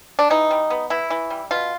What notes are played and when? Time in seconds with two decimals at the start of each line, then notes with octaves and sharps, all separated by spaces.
0.19 D4
0.30 E3 D#4
0.51 G3
0.70 B3
0.90 E3 E4
1.10 E3
1.30 G3
1.51 B2 F4